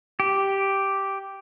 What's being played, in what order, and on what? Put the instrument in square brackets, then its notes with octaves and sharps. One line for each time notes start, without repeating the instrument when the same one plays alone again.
[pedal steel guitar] G4